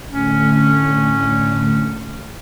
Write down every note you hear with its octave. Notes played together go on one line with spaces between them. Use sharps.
A2 D3 A3 C#4